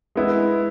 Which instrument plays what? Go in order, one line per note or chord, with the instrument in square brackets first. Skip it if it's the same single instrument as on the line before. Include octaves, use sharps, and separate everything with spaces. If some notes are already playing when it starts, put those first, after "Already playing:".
[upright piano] G#3 B3 E4